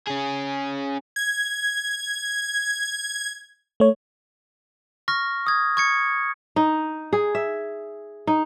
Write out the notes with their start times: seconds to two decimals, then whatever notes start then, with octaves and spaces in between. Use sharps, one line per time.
0.08 C#4 G#4
1.16 G#6
3.80 A3 C#5
5.08 C#6 F6 A#6
5.47 D#6 G#6
5.77 C#6 G#6 C#7
6.56 D#4
7.13 G#4
7.35 E5
8.27 D#4